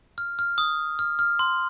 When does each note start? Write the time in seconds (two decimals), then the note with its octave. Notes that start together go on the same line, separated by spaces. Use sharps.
0.18 F6
0.39 F6
0.58 D#6
0.99 F6
1.19 F6
1.39 C6